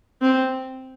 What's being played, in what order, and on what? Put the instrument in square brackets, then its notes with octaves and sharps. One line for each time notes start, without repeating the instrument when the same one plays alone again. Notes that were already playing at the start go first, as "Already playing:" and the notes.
[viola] C4